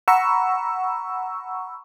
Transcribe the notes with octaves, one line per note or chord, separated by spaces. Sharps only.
F#5 A#5 B5 C#6 E6